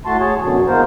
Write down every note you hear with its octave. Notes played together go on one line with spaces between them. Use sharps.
A2 A3 F#4 A5 C6
G#4 C#5 A5
F#2 B2 D3 F#3
E3 G#3 A#3 B3 A#4 C5